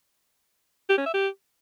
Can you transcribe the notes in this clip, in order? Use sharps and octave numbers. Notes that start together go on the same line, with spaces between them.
G4
C#4
E5
G4